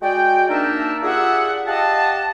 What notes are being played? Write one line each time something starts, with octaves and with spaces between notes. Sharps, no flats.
G#3 F#4 D5 G5
A#3 D4 D#4 A#4 E5 A5
F4 G4 G#4 D5 E5 F#5
G4 D#5 F5 F#5 A5